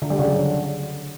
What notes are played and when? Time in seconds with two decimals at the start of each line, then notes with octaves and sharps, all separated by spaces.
0.02 D3
0.10 G3
0.19 C#3
0.27 F#3
0.36 D3